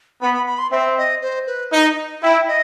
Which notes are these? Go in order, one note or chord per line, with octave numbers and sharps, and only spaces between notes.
B3 B5
B5
B5
C6
C4 E5
D#5
C5
B4
D#4
E4 G5
D#5